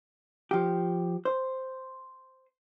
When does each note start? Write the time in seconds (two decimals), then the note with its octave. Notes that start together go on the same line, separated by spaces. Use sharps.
0.51 F3 G4
1.25 C5